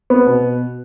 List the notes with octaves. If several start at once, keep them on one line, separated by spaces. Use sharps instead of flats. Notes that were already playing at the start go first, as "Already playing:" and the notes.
B3
B2